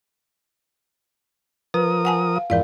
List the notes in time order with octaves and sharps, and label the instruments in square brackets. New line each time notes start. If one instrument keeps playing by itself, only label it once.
[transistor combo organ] F3 A#4 D#6 [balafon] B4
[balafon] F#5 G#5 A5
F5
[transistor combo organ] F2 G#2 E3 [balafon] A#4 D5 F5